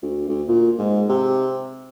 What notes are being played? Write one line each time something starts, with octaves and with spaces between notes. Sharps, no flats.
D2
D2
A#2
G#2
C3